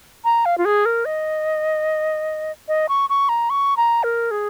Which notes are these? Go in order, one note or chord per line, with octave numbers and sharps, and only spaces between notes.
A#5
F5
F4
G#4
A#4
D#5
D#5
C#6
C#6
A#5
C#6
A#5
A#4
G#4